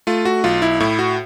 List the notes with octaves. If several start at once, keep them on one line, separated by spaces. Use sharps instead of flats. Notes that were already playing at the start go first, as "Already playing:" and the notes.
A3 F4
F#4
B1 F4
E4
A2 E4
F#4